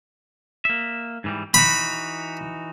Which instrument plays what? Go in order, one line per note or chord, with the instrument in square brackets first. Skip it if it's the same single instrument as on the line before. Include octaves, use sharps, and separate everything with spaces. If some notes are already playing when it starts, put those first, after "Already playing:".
[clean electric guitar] A#3 E5
G#2 E3 G3
[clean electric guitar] E3 D#4 F#4 [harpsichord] B5